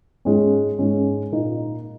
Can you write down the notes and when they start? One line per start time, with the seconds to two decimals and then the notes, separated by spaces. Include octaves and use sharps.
0.25 G#2 G#3 C#4
0.79 G#2 G#3 C#4
1.32 A#2 A#3 D#4